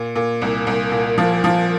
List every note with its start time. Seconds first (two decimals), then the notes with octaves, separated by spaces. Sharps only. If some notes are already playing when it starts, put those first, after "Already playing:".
Already playing: A#2
0.15 A#2
0.42 C2
0.67 C2
0.92 A#2
1.18 F3
1.44 F3